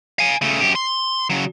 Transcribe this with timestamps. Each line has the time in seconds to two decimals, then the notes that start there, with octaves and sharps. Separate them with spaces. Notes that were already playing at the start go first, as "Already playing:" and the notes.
0.19 F5 G#5
0.41 C#3 A3
0.60 F#2 G4
0.76 C6
1.30 C#3 F#3